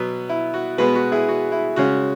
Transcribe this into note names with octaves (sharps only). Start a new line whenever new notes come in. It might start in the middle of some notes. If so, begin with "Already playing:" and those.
Already playing: B2 F#3 B3
E4
F#4
B2 G#3 B3 F#4 B4
F#4
E4 G#4
F#4
E4
C#3 G#3 C#4 F#4